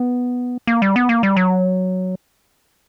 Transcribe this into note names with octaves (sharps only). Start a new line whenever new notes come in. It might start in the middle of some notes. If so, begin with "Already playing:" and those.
Already playing: B3
A#3
G3
B3
A#3
G3
F#3